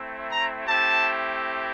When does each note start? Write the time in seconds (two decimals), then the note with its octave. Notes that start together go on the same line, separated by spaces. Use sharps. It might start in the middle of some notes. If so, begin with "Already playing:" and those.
Already playing: A3 C4 E4
0.30 A#5
0.66 A3 C4 E4 G4 A5